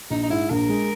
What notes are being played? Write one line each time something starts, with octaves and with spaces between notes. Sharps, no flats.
A#1 D#4
D#4
G#2 E4
A#1 A#4
G#3